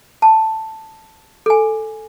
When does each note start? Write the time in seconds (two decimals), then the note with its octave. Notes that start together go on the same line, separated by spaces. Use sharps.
0.22 A5
1.46 A4 G#5